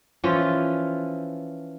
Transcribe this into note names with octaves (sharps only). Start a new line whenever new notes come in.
E3 F3 C#4 F4